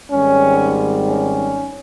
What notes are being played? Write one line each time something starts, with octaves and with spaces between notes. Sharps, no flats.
G#1 G#2 D#3 G3 C4 C#4
C#4